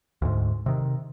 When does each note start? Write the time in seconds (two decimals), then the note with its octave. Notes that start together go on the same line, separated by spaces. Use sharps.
0.22 D2 G#2
0.66 C3 D#3